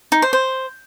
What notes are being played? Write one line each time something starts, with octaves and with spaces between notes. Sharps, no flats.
D#4
C5
C5